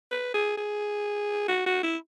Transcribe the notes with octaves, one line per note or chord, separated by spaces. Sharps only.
B4
G#4
G#4
F#4
F#4
E4